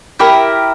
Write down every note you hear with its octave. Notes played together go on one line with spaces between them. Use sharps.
E4 G4 A#4